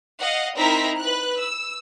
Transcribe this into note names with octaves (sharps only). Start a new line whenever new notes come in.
D#5 F5 F#5
C4 D#4 E4 A#4 A#5 B6
B4 F#6
E6